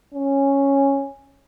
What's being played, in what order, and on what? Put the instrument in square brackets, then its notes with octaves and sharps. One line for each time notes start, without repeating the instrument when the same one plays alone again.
[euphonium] C#4